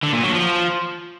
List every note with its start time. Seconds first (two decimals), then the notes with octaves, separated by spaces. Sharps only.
0.03 D3
0.13 A#2
0.24 F#3
0.34 F3